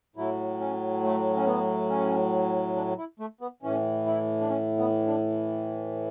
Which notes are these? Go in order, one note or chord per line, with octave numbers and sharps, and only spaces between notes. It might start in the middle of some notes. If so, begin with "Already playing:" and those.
A2 F#3 E4
C#4
A3
C#4
B3
C#4
D4
E4
A3
B3
A2 E3 C#4
E4
D4
C#4
B3
D4